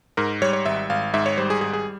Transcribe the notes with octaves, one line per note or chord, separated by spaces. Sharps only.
G#2 A#4
G3 C#5
C#5
G#1 E5
G#1 F5
G#2 E5
C#5
G3 C5
G#4
G#1 G#4
G#4